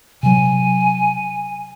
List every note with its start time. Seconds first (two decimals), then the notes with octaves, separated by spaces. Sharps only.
0.23 C3 F#3 G#5